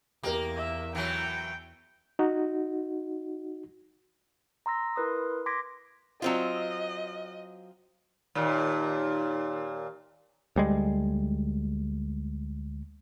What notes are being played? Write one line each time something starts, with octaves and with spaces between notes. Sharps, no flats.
E2 A#3 G4 A#4
E5
E3 F#3 G5
D#4 F#4
A#5 C6 E6 A#6
E4 A#4 B4 C6 D#6
C6 D6 G#6 A#6 B6 D7
F#3 C4 F4 D#5
D#2 A#2
D2 G3 G#3